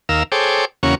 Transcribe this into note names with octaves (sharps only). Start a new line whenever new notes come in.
D#2 A#4 F5 E6
G#4 A4 C5 C#5 G5 D6
E2 C#3 A#3 C#4 F#4 C#6